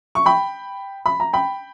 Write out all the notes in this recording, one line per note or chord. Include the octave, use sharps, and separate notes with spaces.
C#6
G5 B5
B5
A#5
G5 B5